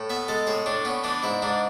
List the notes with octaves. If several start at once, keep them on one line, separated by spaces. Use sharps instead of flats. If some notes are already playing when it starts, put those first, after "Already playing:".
Already playing: A2
B3 E5
G#3 A4
A2 G#4
A2 D4
B3 C#4
E3 D4
G#2 E4
G#2 D4